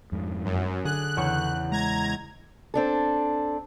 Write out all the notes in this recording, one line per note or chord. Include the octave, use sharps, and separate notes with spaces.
F2 G#2
F#2
D3 G#4 F#6
E2 C#3 C#6
G#3 A#5 G#6
C4 D4 A4